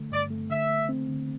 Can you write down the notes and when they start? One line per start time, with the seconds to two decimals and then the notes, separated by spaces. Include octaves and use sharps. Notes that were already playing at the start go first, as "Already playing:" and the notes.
Already playing: D3 A3
0.11 G2 D5
0.30 A3
0.50 D3 E5
0.69 A3
0.89 C4
1.09 D3